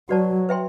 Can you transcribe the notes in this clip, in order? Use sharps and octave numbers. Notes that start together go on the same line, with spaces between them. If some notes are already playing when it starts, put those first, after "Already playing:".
F#3 F#4 B4 D5 A5
B4 E5 G5 C6